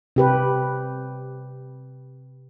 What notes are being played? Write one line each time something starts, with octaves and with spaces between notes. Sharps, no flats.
C3 G4 B4